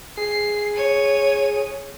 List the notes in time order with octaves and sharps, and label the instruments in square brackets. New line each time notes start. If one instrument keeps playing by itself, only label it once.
[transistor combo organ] G#4 [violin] C7
[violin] C#5 D#7